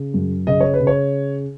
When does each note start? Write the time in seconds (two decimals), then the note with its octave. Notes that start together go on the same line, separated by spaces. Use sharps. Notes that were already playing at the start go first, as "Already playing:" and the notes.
Already playing: C#3
0.14 F#2
0.47 C#3 D#5
0.61 C#5
0.74 B4
0.80 C#3
0.87 C#5